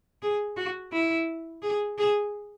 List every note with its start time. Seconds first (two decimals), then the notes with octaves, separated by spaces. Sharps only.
0.22 G#4
0.57 F#4
0.93 E4
1.63 G#4
1.98 G#4